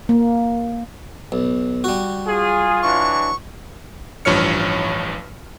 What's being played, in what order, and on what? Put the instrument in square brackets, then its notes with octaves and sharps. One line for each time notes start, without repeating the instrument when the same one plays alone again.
[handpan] A#3
[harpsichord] B1
G3 F#4
[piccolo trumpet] F4 [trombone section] G#4
[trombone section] E3 F#3 D4 [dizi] C#6
[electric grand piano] A1 G2 F3 C#5 F6 C#7